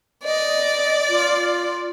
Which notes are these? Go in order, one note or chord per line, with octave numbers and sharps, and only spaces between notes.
D5 D#5
F4